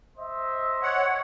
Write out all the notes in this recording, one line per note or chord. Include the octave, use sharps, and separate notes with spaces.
C5 D#5 E5
C#5 F#5